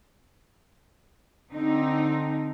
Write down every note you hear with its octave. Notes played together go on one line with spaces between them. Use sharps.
D3 C4 D#4